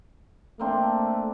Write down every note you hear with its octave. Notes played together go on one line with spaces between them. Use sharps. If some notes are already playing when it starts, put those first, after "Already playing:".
A3 A#3 C4 D4